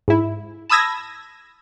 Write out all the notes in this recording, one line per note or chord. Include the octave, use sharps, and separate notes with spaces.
G#2 E4
A5 B5 D#6 E6 G#6 A#6